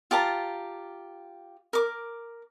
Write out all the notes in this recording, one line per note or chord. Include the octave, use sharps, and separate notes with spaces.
F4 G4 A5 A#5
A#4 D6